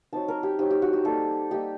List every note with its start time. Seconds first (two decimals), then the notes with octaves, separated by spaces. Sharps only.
0.13 F#3 C4 D#4 A5
0.28 A#4
0.43 G4
0.59 F#3 C4 D#4 G4
0.71 G4
0.82 F#4
0.93 G4
1.04 G3 A#3 D#4 A4
1.51 G3 A#3 D#4 G4